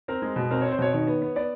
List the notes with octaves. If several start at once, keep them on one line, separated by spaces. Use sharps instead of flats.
C4 A#4
G#3
B2
C4 A#4
C4 C#5
C5
B2 C#5
D#3 C#5
B3
B3
B3 D5